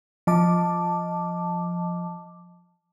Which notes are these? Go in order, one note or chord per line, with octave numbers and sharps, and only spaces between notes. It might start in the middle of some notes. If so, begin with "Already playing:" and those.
F3 D#5 A5 D6